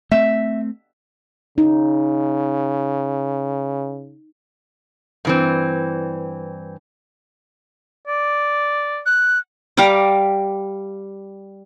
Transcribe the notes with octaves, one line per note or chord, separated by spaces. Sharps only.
A3 C4 E5
C#3 D#4
G2 E3 C4
D5
F#6
G3 F5 A#5 D6